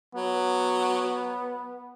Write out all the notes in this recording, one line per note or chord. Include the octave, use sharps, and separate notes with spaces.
F#3 B3